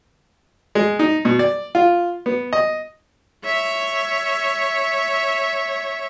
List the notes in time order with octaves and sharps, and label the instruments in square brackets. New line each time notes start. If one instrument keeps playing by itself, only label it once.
[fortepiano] G#3
D#4
B2
D5
F4
B3
D#5
[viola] C#5 E5